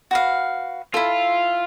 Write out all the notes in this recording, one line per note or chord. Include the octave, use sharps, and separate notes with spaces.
F#4 B4 F5
E4 F4 A4